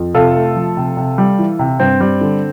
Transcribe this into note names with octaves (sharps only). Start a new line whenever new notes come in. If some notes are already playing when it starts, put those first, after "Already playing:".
Already playing: F2
C3 F4 A4
A3
F3
C3
C3
G3
E3
C3
G2 C4
G3
D3